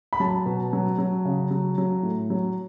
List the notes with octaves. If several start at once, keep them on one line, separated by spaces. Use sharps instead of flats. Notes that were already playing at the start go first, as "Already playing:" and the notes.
B5
F#3 A5
B2
F#3
F#3
C#3
F#3
F#3
A2
F#3